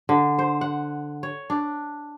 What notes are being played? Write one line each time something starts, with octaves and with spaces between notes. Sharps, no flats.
D3
C5
F#5
C#5
D4